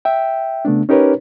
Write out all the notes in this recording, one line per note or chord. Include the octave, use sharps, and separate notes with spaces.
E5 G5
C#3 A3 B3 D4
C#4 D#4 G4 A#4 B4 C#5